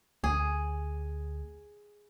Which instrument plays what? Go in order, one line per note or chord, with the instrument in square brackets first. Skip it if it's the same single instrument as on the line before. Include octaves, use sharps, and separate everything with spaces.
[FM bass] D2 [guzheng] G#4